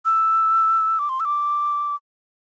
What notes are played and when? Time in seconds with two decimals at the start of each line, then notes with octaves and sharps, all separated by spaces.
0.05 E6
0.99 D6
1.09 C6
1.20 E6
1.25 D6